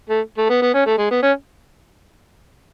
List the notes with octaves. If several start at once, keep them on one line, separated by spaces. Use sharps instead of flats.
A3
A3
B3
B3
C#4
A3
G#3
B3
C#4